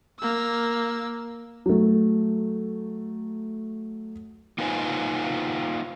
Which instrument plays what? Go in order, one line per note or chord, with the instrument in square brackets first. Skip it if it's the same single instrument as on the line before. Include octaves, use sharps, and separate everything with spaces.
[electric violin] A#3 E6
[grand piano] F#3 A3
[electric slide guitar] A#3 D#4 F4 B4 C5 G#5